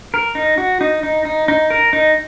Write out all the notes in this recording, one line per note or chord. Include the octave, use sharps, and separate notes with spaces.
A#4
D#4
F#4
D#4
D#4
D#4
D#4
A#4
D#4